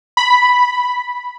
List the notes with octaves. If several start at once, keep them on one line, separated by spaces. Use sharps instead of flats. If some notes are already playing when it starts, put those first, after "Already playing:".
B5